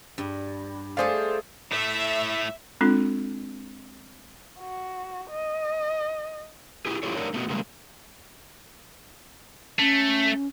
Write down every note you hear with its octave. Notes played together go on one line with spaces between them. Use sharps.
G2
A3 G#4 A4 C5 D5 F5
A2 A3 E5
G#3 C4 D4 F4 A4
F#4
D#5
E4 G4 G#4
E4 F4 G4 A4 C#5
D4 D#4 A#4 C#5
A3 B3 F#4
C#3 G3 G#3 A#3
A3 C#4